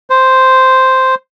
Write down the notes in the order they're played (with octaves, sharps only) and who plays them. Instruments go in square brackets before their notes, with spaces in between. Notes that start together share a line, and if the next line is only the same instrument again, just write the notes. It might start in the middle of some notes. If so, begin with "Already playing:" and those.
[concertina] C5